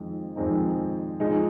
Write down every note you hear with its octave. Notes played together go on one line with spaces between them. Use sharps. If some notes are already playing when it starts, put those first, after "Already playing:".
Already playing: F2 D#3 G#3 C4
F2 D#3 G#3 C4 D#4
F3 G#3 D#4 G#4